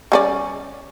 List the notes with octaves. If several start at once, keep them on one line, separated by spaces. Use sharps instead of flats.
G3 C#4 D5